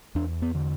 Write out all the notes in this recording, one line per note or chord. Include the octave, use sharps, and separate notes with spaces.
E2 D4
B3
D3